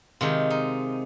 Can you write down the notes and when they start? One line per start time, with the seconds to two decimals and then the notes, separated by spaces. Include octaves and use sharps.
0.21 C3 D#3 G#3 F4
0.50 D#4